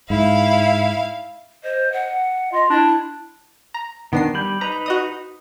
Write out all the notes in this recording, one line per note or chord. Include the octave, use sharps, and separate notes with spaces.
G#2 E4 F5
C5 D#5
F#5
F4 D#5
D4 E4
A#5
D#3 B3 D4 C7
G3 B5 G6
D#4 B4 A#5 B5
F#4 D#5 D#6